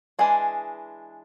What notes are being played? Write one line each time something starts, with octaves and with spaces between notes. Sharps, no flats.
E3 G#3 D4 G#4